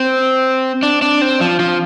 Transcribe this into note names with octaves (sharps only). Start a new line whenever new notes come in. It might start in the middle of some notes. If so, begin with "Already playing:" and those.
Already playing: C4
D4
D4
C4
F3
F3